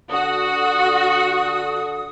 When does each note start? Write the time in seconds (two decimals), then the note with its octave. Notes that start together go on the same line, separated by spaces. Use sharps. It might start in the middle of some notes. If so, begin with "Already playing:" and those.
0.10 D3 F#4 D#6